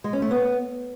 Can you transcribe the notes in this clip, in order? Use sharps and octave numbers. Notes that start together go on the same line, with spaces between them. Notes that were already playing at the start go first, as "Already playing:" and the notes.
G#3
C#4
A3
B3